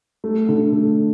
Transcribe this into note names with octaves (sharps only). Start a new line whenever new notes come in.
A3
D3
A3